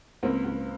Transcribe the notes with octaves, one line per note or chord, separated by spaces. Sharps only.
C#2 A#3 C4
C#2